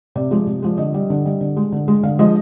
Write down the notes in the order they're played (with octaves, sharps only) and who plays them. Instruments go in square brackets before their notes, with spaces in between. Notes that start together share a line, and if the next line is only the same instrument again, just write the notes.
[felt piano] C3 D5
F3 G#3
C3
F3 G#3
D3 D#5
G3
D3
G3
D3
G#3
D3
G#3
D3 F5
F3 G#3 D#5